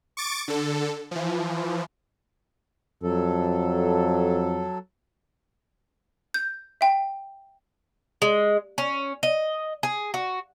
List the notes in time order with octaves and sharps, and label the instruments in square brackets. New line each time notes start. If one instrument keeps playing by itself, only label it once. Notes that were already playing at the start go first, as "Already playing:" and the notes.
[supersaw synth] C#6 D6 A6 D7
D3 A4
E3 F3
[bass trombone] F2 [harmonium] F#3 A4
[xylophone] G6
E5 G5
[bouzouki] G#3
C#4
D#5
G#4
F#4